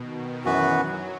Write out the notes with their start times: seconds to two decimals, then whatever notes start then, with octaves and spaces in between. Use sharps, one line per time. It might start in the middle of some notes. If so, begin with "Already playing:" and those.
Already playing: B2 D#3
0.45 F#2 E3 F#3 B3 F#4 B4